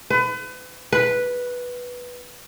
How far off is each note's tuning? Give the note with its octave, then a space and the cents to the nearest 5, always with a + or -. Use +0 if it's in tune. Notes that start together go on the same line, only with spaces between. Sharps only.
B4 +35
B4 -5